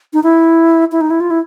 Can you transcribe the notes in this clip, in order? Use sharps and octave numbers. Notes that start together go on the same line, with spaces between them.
D#4
E4
E4
D#4
E4
F4
E4